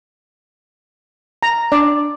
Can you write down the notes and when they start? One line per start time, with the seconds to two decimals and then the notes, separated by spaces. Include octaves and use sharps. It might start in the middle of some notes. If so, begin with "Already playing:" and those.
1.43 A#5
1.72 D4 D5